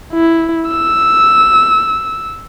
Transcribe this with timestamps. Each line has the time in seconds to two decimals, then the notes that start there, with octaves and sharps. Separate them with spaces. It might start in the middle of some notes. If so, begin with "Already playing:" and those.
0.13 E4
0.69 E6